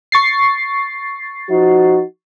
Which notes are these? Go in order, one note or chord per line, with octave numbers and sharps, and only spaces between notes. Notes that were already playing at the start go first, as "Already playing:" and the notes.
C#6 A6 C7
F3 D#4 F#4